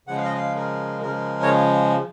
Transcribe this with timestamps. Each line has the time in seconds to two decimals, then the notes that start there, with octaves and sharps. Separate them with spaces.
0.07 C#3 F3 G#3 F#5
0.17 F5
0.25 D#5
0.34 F5
0.55 A#4
1.02 C#3 F3 G#3 A#4
1.42 C#5